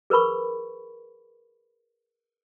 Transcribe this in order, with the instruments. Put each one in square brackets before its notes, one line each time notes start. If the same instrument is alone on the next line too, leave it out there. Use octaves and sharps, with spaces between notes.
[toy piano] G#4 A#4 B4 B5 C#6